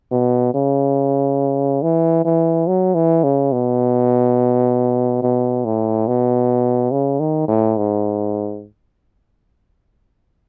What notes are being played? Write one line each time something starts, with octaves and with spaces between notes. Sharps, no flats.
B2
C#3
E3
E3
F#3
E3
C#3
B2
B2
A2
B2
C#3
D#3
A2
G#2